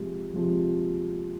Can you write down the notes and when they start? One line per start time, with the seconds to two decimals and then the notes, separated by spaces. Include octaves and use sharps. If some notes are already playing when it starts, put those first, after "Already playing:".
Already playing: C3 F3 G#3
0.34 C3 F3 G#3